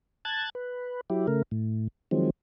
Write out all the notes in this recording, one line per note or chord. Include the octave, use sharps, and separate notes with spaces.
A5 F#6 G#6 A6
B4
F#3 E4 G4
C#3 A3 A#4
A2
D#3 F3 F#3 G#3 C4